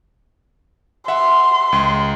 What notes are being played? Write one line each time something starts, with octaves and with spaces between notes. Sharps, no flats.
E5 F#5 C6
C#2